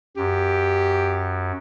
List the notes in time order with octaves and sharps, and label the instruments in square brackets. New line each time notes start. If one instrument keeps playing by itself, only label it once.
[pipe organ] F#2 [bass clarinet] G4